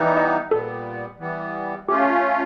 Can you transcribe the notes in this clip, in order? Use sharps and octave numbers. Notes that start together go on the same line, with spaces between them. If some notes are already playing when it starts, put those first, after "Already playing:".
Already playing: E3 G3 B3 D#4
D#5
A#2 G3 B3 A4
E3 G3 B3
A3 C#4 F4 G4